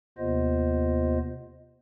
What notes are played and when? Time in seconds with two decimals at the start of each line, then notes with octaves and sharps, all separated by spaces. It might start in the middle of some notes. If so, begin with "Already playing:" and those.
0.18 D#2 C3 B3 F4 C5 D#5